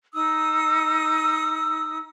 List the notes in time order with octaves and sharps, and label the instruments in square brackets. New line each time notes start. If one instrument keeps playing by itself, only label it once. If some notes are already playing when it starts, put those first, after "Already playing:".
[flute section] D#4 D#6 E6